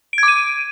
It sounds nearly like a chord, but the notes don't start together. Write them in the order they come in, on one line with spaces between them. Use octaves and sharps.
D7 G#6 D6 D#7